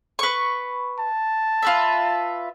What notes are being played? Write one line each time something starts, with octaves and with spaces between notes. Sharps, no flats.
B4 C#6
A5
F4 B4 E5